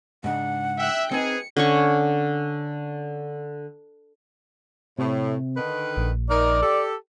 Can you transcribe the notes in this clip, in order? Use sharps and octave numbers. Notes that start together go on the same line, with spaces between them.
G#2 C#3 D4 F#5
E5 G5 F#6
C4 D#4 G#4 B4 C#7
D3 C#4 C#6
A2 C3
D3 D#3 B4
A#1
D#4 A#4 D5
G4 A4